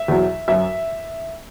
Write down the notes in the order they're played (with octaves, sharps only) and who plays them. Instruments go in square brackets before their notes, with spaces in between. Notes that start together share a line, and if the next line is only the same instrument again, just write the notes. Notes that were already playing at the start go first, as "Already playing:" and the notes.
Already playing: [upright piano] E5
E2 B2 F#3
F#2 F#3 E5